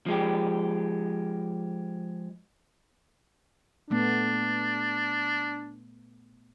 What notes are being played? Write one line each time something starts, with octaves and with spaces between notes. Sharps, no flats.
F3 G#3 G4
A#2 A3 B3 D4